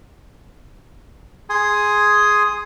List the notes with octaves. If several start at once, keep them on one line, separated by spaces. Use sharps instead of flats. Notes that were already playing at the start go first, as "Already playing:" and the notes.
G#4 G#5 C6 D#6